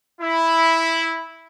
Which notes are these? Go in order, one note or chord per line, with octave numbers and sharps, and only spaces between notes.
E4